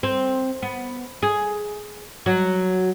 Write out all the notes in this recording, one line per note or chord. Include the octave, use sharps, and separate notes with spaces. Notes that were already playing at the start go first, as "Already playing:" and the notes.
C4
B3
G#4
F#3